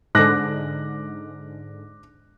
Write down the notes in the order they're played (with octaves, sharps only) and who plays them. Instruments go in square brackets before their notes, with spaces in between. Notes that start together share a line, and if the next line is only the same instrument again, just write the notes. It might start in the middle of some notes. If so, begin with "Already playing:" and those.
[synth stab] G#2 D3 [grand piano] D6 F#6 A#6